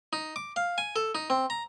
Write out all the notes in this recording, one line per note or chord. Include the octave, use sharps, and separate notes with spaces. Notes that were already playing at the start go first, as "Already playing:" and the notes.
D#4
D6
F5
G#5
A4
D#4
C4
A#5